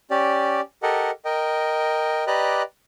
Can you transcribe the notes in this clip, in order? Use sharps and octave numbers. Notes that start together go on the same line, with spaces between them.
C#4 G4 D5
G4 A4 A#4 D#5 F#5
A#4 D#5 G5
G4 B4 D5 D#5 A#5 F#6